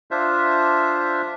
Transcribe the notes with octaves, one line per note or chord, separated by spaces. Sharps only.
D4 F4 C5 E5